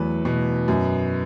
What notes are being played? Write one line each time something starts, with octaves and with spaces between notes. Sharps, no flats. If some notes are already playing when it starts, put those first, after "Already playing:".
Already playing: E2 F#3 A3 B4
B2
F#2